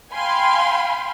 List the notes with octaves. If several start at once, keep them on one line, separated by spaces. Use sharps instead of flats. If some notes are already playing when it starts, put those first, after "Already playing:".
F5 G5 G#5 B5 C6